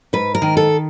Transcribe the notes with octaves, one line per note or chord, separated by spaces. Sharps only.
G#2 B4
A#4
D#3
A4